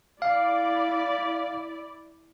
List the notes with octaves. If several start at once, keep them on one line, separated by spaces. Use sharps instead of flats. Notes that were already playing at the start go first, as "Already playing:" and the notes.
E4 D5 F5